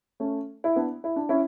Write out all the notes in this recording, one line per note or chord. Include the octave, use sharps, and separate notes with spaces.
A3 C#4
E4
B3 D4
E4
D4
C#4 E4